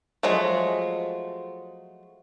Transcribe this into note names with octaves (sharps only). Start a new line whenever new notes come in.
F3 F#3 G#3 A3